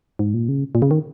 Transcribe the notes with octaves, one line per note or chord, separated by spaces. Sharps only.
G#2
A#2
C#3
A#2
C#3
D#3